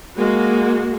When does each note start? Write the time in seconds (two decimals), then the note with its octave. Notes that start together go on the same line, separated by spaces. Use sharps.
0.19 G#3 A#3 F#4